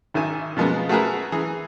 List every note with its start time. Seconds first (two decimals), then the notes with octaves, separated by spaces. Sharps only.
0.14 G#1 D#3 E5 G#5
0.57 B2 F3 G#3 A#3 B3
0.89 A3 F#4 G#4 A#4 B4
1.32 E3 G#4